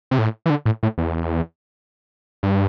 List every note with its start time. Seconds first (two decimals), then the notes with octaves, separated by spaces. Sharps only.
0.11 C3
0.19 A2
0.46 E3
0.50 D3
0.66 A2
0.83 A2
0.98 E2
2.43 G2